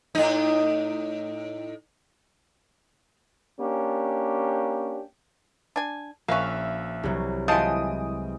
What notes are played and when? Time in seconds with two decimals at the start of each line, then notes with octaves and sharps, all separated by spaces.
0.15 A2 D#4
3.59 A#3 C#4 D4 G4
5.76 D4 G#5
6.28 A#1 A#3 C#4 B4 E5 F5
7.03 C2 F#3
7.48 E3 G#3 F4 C5 A5 D#6 D7